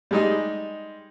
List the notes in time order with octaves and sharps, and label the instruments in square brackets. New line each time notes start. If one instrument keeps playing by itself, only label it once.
[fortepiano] G3 G#3 D#4